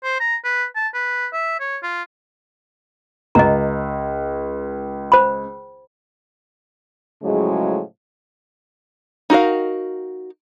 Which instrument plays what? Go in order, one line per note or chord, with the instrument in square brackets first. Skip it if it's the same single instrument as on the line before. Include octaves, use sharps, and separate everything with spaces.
[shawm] C5
A#5
B4
A5
B4
E5
C#5
F4
[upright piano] C#2 [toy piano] D#5 A#5
[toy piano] C5 B5
[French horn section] A2 C#3 F3 F#3 G#3
[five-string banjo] D#4 F#4 A#4 F5